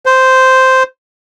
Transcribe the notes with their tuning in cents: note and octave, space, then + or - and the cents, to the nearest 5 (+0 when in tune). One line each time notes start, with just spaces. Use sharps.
C5 -5